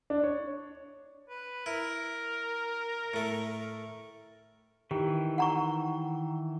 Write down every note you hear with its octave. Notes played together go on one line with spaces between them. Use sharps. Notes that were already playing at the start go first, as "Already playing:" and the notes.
D4
C#5
B4
E4 A#4
A2 A3
D#3 E3 G4
F#5 A#5 C#6